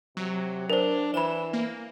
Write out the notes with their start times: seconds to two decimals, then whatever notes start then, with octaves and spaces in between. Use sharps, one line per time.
0.17 C3 F#3
0.70 D4 A#4 C5
1.14 E3 C5 B5 E7
1.53 A#3